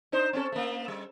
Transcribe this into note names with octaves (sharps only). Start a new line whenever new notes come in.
D4 D#4 C5
C4 C#4 A4
A3 A#3
G3